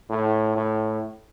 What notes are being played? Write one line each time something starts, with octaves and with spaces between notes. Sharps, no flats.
A2
A2